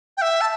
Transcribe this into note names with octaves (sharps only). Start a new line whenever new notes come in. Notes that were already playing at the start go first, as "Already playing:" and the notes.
G5
E5
A5